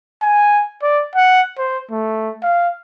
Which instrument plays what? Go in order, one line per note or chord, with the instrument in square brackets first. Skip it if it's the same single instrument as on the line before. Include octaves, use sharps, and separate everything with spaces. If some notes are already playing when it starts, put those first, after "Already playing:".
[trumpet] G#5
D5
F#5
C5
A3
F5